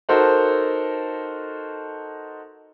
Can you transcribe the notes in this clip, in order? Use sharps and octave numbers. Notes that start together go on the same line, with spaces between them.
D#4 F#4 A4 A#4 C5